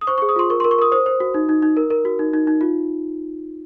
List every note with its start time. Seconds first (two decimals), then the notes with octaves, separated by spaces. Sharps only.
0.01 D#6
0.07 C5 C#6
0.18 G#4 C#6
0.29 D#6
0.36 F4 C6
0.50 A#4 C#6
0.60 A#4 C6
0.71 C#6
0.78 A#4 D#6
0.92 C5 D#6
1.06 C5
1.20 F#4
1.34 D#4
1.49 D#4
1.62 D#4
1.77 A#4
1.90 A#4
2.05 F#4
2.19 D#4
2.33 D#4
2.47 D#4
2.61 F4